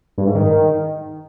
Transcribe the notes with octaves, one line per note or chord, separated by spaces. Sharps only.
G2
G#2
D#3